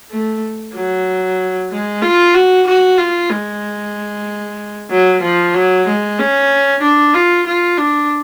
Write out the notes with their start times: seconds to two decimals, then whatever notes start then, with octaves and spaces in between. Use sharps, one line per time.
0.11 A3
0.74 F#3
1.71 G#3
2.02 F4
2.34 F#4
2.67 F#4
2.98 F4
3.30 G#3
4.91 F#3
5.22 F3
5.54 F#3
5.87 G#3
6.19 C#4
6.82 D4
7.14 F4
7.46 F4
7.78 D4